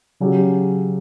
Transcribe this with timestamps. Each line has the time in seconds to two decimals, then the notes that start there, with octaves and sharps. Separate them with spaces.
0.20 C#3 F#3 C#4 G4